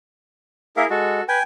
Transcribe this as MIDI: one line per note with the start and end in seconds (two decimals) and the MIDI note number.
0.77 0.85 58
0.77 0.87 64
0.77 0.87 68
0.77 0.87 70
0.77 0.85 76
0.77 0.85 77
0.90 1.21 56
0.90 1.23 66
0.90 1.23 69
1.28 1.38 71
1.28 1.43 79
1.28 1.43 80